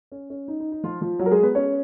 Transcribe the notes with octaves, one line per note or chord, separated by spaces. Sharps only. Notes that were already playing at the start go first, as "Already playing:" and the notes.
C#4
C#4
D#4
D#4
D#4
F3 F4
F3 F4
F#3 F#4
A#4
G#3 G#4
B3 B4
C#4 C#5